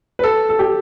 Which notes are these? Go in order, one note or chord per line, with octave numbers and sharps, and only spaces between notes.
B4
A4
A4
G4